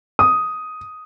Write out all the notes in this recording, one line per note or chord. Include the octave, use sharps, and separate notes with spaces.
D#6